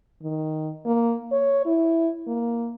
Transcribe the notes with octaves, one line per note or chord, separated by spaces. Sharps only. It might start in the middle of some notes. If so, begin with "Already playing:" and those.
D#3
A#3
C#5
E4
A#3